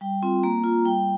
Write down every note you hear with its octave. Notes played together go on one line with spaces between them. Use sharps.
G3 G5
C4 F4
A#3 A#5
F4
G3 G5